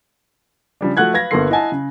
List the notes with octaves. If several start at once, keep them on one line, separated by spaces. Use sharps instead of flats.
C#3 F3 G3 D4
F3 A3 F#4 F#5 F#6 G#6
B4 F5 G#6 A#6
G1 A#3 B3 A4 C6 C7
E4 D#5 F#5 G#5 A5
C#3